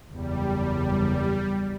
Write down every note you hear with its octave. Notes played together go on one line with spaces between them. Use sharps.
F#1 E2 G3